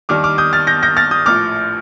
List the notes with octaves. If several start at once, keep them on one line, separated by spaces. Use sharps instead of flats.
D#2 D#3 G3 D4 D6 F6
D6 F6
D#6 G6
F6 A6
G6 A#6
G6 A#6
F6 A6
D#6 G6
A#1 A2 F3 D6 F6